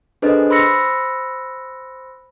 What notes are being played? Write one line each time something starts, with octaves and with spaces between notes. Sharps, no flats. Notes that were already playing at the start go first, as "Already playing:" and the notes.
D4 G#4 A4 B4 C5 D#5
C5 B5 C6 E6 A#6 C#7